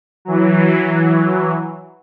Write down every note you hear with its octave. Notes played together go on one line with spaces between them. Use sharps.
E3 F#3